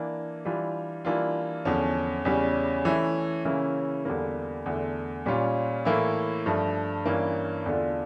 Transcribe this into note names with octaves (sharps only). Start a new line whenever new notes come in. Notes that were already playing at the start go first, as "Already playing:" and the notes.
Already playing: E3 A#3 D4
E3 G3 D4 F4
E3 G3 A#3 D4 F4
E2 D3 F3 C#4
E2 C#3 G3 C#4
E3 A3 C#4 E4
C#3 E3 A#3 C#4 E4
E2 D3 G3 A#3
E2 D3 A3
A#2 G3 C#4 F4
A2 E3 A#3 E4
G2 F3 A3
G2 E3 A#3 C#4
E2 D3 A3 D4 F4